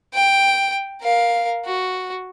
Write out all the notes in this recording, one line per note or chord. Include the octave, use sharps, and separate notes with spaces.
G5
A#4 F5
F#4